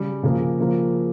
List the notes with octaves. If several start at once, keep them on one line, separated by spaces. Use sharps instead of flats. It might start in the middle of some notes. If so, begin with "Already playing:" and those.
Already playing: C#3 G3
C#3 F3 A#3
C#3 F3 A#3